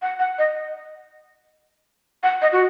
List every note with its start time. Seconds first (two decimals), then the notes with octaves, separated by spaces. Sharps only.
0.02 F#5
0.19 F#5
0.38 D#5
2.23 F#5
2.42 D#5
2.52 F#4